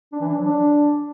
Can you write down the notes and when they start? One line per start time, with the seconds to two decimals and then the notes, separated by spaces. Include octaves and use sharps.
0.13 D4
0.21 E3
0.29 D4
0.37 F#3
0.45 D4